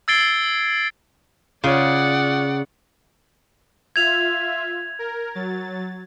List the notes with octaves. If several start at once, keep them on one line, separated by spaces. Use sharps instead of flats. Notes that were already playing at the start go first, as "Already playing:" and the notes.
E6 G#6 A6 C7 D7 G7
C#3 F4 C#5 D5 F#5
F4 E5 G#6 F7
A#4
F#3 A6